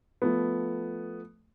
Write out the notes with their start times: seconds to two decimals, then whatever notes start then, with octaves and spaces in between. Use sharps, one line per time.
0.22 F3 A3 B3